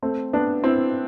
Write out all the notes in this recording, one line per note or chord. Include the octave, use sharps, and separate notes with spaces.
A3 C4
B3 D4
C4 E4